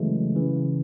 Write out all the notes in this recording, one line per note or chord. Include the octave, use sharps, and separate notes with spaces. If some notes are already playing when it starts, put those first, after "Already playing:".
Already playing: C#3 E3 F#3 G#3 A3
C#3 E3